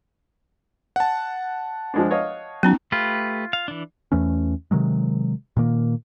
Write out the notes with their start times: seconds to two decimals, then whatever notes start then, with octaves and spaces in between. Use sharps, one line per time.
0.96 F#5 A5
1.94 F3 G#3 D4
2.11 C#5 D#5 F5
2.63 F#3 B3 C#4 D#4
2.92 A3 F4 G4 B4
3.53 F5
3.68 E3 D4
4.12 E2 E3 A3 C#4
4.71 C3 D#3 F#3 G#3
5.57 A#2 D#3 A#3